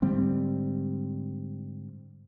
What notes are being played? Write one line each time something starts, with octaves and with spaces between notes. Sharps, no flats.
G#2 D3 G3 C4